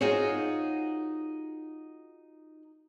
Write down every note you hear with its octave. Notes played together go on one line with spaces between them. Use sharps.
D#4 F4 F#4 G#4 C5 C#5